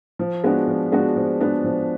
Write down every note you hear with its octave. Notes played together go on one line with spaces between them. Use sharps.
F3
G#3 B3 D4 F#4
F3
G#3 B3 D4 F#4
F3
G#3 B3 D4 F#4
F3